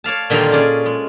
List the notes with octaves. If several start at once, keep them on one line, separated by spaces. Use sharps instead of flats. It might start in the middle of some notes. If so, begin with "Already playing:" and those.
C#5 D5 F5 A5
A#2 D3 D#3 G3 D#4 F4
C#4 G#4 D5
G#3